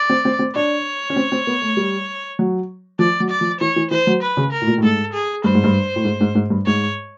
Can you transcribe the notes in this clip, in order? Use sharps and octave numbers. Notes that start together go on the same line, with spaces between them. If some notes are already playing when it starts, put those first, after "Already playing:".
Already playing: D5
C4
C4
C4
D4 C#5
C#4
C4
C4
B3
A3
G3
F#3
F3 D5
F#3
D5
F3
E3 C#5
E3
E3 C5
F#3
B4
C#3
A#4
A2
A#2
A2
G#2 A4
G#4
G2 C5
G#2
G2
A2
G#2
G#2
G#2
G2
G#2 C#5